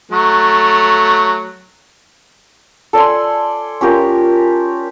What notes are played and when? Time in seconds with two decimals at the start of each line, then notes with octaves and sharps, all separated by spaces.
0.12 F#3 A3
2.93 A4 D5 G#5 C6
3.81 C#4 F4 G4 A#4